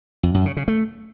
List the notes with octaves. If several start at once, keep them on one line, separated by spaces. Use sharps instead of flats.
F2
F#2
C#3
C#3
A3